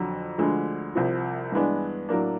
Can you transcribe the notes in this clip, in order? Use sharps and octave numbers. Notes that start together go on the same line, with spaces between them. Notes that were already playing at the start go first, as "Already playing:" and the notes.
Already playing: F2 D3 F#3
D2 D3 F3 G#3
C2 C3 F3
G2 E3 G#3 B3 D4
A2 F#3 A#3 D4